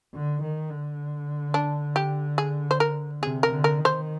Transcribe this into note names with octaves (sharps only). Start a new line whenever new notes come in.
D3
D#3
D3
D4
G4
G#4
C5
A#4
C3 G#4
A#4
D3
A#4
D#3
C5